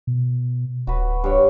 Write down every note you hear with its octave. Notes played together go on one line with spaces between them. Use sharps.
B2
D1 F#4 B4
G2 C#5